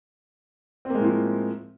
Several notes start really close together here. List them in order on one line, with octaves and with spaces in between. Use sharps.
C4 A#3 G#3 A2 F3